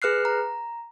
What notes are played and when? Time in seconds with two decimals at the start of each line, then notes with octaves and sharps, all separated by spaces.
0.02 G#4 B4 F6 F#6 C7
0.25 A#5